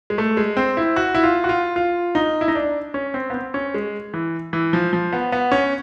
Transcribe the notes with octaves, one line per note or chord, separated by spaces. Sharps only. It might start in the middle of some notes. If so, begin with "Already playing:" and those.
G#3
A3
G#3
C4
E4
F#4
E4
F4
F#4
F4
F4
D#4
E4
D#4
D4
C#4
C4
B3
C4
C#4
G#3
E3
E3
F3
F3
B3
B3
C#4